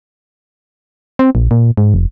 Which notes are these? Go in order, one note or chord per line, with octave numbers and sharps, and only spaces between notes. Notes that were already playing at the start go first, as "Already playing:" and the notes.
C4
A#1
A#2
G#2
F1